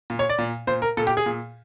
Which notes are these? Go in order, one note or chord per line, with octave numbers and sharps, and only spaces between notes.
A#2
C#5
D5
A#2
A#2 C5
A#4
A#2 A4
G4
G#4
A#2